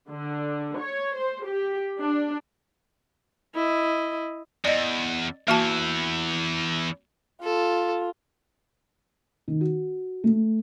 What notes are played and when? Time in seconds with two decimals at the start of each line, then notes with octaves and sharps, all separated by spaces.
0.11 D3
0.79 C#5
1.16 C5
1.47 G4
2.01 D4
3.55 E4 D#5
4.65 E2 D5 D#5
5.48 E2 E3 A#3 F#4 A5
7.43 F4 A4
9.48 D#3
9.61 F#4
10.24 A3